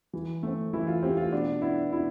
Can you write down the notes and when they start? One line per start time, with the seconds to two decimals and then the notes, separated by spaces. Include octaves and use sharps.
0.13 E3
0.43 A3 C4
0.73 E3 E4
0.87 F4
1.03 A3 C4 G4
1.17 F4
1.32 B2 D4
1.62 B3 D4 E4
1.92 B2 E4